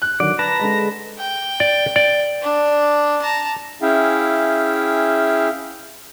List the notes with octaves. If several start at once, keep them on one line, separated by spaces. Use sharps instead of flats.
F#6
D3 D#3 F#3 F#4 D5
B4 A5 A#5 A#6
D3 G#3
G5
D5
D5
D4
A5 A#5
C#4 E4 G#4 E5 F5 G5